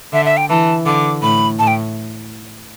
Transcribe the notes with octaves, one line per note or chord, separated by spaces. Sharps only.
D3 E5
E5
G5
E3 A5
D3 D6
A2 B5
A2 A5
G5